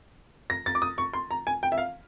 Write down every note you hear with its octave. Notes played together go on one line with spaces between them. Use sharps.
A#6
A6
D6
D#6
C#6
C6
A#5
G#5
G5
E5
F5